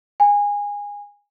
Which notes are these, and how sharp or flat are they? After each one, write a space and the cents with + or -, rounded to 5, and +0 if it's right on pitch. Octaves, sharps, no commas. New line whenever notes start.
G#5 -20